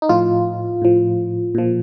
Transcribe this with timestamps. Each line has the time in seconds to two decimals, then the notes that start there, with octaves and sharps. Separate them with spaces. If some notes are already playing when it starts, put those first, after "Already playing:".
0.02 D#4
0.09 A2 F3 F4
0.82 A2 F3
1.55 A#2 F3